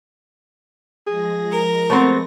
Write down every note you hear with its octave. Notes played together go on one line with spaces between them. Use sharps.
F3 G#3 G#4 A#6
A#4
A3 B3 C4 C5